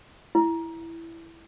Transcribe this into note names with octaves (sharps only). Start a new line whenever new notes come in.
E4